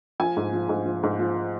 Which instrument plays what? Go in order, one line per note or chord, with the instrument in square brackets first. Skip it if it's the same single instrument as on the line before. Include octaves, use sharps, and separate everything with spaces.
[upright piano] F3 G#5
G#2
F3
G#2
F3
G#2
F3